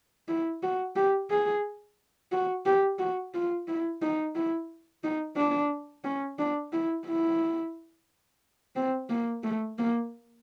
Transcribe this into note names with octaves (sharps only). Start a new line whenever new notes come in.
E4
F#4
G4
G#4
F#4
G4
F#4
F4
E4
D#4
E4
D#4
D4
C#4
D4
E4
E4
C4
A#3
A3
A#3